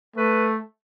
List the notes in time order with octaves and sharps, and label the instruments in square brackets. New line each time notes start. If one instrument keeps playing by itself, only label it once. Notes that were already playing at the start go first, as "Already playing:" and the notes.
[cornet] A3 [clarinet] B4